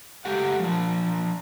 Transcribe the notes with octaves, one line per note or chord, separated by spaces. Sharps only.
G#3 A3 G4 F#5
F3 D4